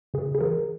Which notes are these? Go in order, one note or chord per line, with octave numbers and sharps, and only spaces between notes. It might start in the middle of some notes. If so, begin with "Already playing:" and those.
C#3 G#4
G#4
E3 A#4